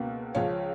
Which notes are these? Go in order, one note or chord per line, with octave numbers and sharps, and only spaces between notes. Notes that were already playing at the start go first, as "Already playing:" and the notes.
Already playing: C#2 B2 A#3 B4
C#2 C#3 F3 C#5 F5